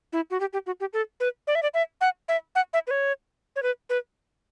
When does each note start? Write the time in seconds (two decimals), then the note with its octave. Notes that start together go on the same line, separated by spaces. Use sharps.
0.13 E4
0.30 F#4
0.40 G4
0.53 G4
0.66 F#4
0.80 G4
0.93 A4
1.20 B4
1.47 D5
1.55 E5
1.63 D5
1.74 E5
2.01 F#5
2.28 E5
2.55 F#5
2.73 E5
2.87 B4
2.91 C#5
3.56 C#5
3.63 B4
3.90 B4